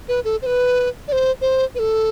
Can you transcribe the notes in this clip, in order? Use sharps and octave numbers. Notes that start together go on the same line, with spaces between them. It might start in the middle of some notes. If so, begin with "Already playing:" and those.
B4
A4
C5
B4
D5
C5
C5
B4
A4